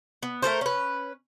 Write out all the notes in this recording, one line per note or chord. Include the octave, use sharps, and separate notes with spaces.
B3
A3 A4 A#4 C5
C#4 B4